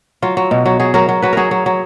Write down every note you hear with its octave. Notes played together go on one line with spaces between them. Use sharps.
F#3 F4
F#3
B2
F#3
F#3 G#4
F#3 A#4
F#3
F#3 B4
F#3 G#4 A#4
F#3
F#3